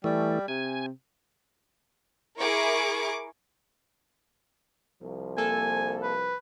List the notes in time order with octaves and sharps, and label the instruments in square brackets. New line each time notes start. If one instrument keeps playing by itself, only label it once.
[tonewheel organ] E3 A3 [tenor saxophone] G3
[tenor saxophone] C3 [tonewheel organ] G#5
[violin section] E4 G#4 A#4 C#6 D6
[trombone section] C2 F3
[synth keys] A#3 A4 [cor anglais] G#5
[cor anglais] B4